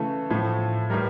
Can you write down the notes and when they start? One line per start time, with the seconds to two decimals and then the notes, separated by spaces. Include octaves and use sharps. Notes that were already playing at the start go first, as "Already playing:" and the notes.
Already playing: C#3 E3 A3 A4
0.30 A2 F3 A3
0.90 A2 E3 G3 A#4